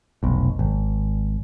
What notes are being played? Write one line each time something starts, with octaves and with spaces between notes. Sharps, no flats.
F1 B1
G#1